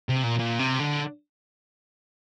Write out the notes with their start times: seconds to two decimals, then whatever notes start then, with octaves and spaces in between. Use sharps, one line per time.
0.09 C3
0.24 A#2
0.40 A#2
0.59 C3
0.79 D3